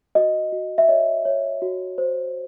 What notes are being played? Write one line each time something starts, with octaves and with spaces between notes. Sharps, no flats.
F#4 D#5
F#4
E5
C#5 D#5
C#5
F#4
C5